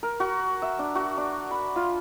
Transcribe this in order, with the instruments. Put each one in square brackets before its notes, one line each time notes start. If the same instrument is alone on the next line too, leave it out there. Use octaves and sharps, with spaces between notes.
[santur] A#4
F#4
E5
D4
F#4
D4
B5
F4